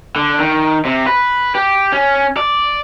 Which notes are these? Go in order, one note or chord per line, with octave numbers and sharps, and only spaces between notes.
D3
D#3
C3
B4
G4
C#4
D5